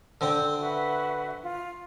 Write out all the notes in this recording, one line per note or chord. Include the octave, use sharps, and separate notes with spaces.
D3 C4 G5
F#4 B4 E5
F4